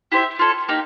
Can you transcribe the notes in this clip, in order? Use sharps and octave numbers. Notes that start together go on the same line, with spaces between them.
E4 G4 C5 E5
F4 A4 C#5
A#3 D#4 G4